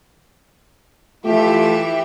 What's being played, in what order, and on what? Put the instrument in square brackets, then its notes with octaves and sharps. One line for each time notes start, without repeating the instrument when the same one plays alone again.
[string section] E3 G4 E5 [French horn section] A3 F4